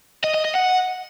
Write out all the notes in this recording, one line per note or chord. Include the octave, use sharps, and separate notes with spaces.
D#5
D#5
D#5
F#5